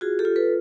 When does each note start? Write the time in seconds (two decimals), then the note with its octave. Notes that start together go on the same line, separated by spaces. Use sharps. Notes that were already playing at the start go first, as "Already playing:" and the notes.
0.01 F4 F#4 G#4
0.19 G4 A4
0.25 F4
0.36 A4 B4